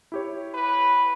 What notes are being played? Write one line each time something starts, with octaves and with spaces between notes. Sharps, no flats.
E4 G4 C#5
B4